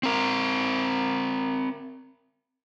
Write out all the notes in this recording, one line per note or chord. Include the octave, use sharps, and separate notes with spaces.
C4 A#4